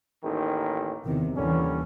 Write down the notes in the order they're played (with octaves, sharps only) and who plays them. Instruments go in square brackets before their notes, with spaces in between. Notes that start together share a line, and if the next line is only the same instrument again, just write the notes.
[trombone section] A1 D#2 D#3
[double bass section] E2 C3 D#3
[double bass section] D#2 E3 [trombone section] D3 G3 C#4